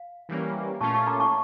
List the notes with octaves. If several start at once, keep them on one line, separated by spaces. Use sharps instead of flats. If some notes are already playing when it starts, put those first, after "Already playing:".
Already playing: F5
E3 G3 A#3 C#4
A#2 A3 C#4 F4 A5 C#6
A5 C#6
A#5 D6
A5 C#6